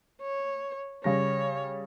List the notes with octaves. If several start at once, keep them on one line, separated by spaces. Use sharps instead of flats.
C#5
C#3 G3 C#5 A#6